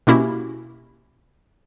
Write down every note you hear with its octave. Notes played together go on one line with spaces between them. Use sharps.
B2 A#3 C#4 E4 F#4 G4